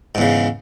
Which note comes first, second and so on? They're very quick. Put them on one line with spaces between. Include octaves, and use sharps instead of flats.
G#2 E2 C#3